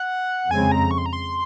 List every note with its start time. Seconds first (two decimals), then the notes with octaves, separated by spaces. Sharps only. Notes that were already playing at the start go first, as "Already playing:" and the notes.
Already playing: F#5
0.51 F2 C#3 G#3 C4 G#5
0.72 A#5
0.91 C#6
0.98 C6
1.06 A#5
1.13 C6